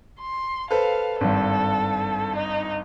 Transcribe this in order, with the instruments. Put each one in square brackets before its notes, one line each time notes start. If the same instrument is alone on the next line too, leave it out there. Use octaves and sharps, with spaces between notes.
[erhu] C6
[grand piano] A4 B4 C5 [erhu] F5
[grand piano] G#1 G2 [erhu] A4
[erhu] D#4